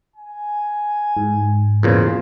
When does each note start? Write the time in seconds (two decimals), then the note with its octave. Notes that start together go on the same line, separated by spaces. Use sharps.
0.16 G#5
1.17 G#2
1.83 E2 A#2 C#3 C5